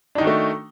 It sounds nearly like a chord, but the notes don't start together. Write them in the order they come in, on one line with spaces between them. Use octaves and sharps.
D4 D#4 D#3 F#4 A3